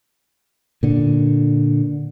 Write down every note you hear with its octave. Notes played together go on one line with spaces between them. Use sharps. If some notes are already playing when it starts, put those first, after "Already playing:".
A#2 D3